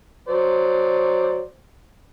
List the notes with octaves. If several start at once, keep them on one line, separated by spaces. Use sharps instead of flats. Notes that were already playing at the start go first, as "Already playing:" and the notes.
F#3 C5 D5